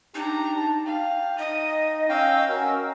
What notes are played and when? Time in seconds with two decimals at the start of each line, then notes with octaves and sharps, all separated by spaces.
0.15 D4 D#4 G4 A#5
0.56 A5
0.85 F5 G5
1.39 D#4 D#5 D#6
2.09 C#4 F5 G5 E6
2.49 C#4 F#4 A#4